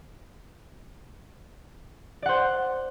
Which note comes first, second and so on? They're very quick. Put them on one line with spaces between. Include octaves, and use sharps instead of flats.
D5 F#5 C5